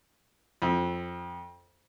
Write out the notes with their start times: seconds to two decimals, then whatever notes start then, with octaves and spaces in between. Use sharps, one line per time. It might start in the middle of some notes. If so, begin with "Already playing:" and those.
0.62 F2